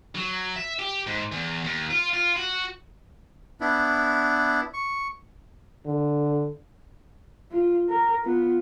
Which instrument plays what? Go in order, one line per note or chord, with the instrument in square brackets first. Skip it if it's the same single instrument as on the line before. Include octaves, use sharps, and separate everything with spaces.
[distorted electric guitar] F#3
E5
G4
G#2
E2
D#2
F4
F4
F#4
[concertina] B3 D4 E4
C#6
[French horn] D3
[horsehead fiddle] F4
A#4
B3 F4